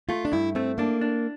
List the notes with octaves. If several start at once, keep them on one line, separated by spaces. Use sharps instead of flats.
A3 F4
D4
G2 E4
A3 C4
A#3 D4
D4